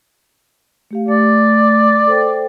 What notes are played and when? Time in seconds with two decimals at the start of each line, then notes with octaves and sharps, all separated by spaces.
0.91 A3 G4 F5
1.08 A3 D5
2.07 A4 C5 G5